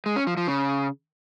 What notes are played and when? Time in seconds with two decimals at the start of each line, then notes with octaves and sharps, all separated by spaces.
0.06 G#3
0.16 C#4
0.27 F3
0.37 F3
0.48 C#3